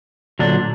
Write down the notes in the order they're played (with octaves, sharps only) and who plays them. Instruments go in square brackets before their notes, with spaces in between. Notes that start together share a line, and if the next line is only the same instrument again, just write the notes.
[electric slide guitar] A#2 D3 F#3 D4